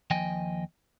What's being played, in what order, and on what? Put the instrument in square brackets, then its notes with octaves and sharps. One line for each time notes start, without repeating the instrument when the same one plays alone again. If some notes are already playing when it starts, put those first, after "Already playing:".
[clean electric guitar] D#2 F3 D#5 G5 G#5